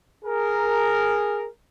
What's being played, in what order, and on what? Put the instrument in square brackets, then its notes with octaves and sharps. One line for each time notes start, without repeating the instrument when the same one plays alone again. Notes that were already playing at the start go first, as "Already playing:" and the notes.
[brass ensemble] G#4 A#4